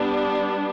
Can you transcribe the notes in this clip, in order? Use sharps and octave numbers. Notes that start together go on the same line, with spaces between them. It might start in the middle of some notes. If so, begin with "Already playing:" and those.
Already playing: G3 B3 D4